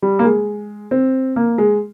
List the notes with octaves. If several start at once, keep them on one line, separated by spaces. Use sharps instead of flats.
G3
A#3
G#3
C4
A#3
G#3